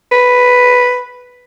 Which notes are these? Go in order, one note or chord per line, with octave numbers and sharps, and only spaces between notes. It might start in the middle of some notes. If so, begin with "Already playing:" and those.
B4